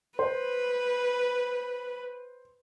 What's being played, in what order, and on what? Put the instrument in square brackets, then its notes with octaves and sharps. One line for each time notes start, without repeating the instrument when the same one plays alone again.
[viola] B4 [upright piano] C5